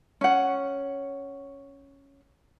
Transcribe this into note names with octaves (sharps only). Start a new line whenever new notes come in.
C#4 F#5